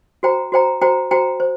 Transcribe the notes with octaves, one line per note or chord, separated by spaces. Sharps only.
F#4 C5 G5 A#5
F#4 C5 G5 A#5
F#4 C5 G5 A#5
F#4 C5 G5 A#5
C5